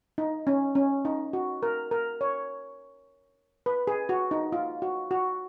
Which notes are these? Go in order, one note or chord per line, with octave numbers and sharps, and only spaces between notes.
D#4
C#4
C#4
D#4
F#4
A#4
A#4
C#5
B4
G#4
F#4
D#4
F4
F#4
F#4